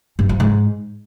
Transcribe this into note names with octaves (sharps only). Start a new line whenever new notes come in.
G2
F3
G#2